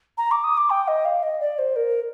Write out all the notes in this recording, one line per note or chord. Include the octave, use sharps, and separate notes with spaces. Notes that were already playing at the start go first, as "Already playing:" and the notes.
A#5
D6
D#6
D6
G5
D#5
F5
D#5
D5
C5
A#4